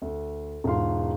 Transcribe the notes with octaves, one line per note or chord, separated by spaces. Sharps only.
D2
E1 G#2 F4 F5 C6